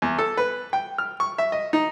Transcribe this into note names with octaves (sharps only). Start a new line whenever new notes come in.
E2
A4
B4
G5
F6
C#6
E5
D#5
D#4